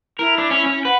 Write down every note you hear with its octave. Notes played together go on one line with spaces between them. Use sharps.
E4 A#4
D4
C#4
C#4
B4 F#5